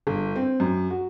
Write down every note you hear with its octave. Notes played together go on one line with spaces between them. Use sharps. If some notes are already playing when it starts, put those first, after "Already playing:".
G1
C4
F#2
F#4